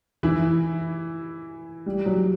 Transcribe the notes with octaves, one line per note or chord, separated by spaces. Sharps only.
E3 E4
G3
F#3